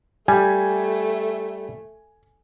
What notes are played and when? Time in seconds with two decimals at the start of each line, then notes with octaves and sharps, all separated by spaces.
0.28 G3 A3 G#5